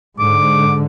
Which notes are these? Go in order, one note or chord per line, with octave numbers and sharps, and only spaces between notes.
G#2 D3 D6